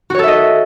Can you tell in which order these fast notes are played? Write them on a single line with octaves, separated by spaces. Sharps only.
F#4 C#5 A4 E5 D#5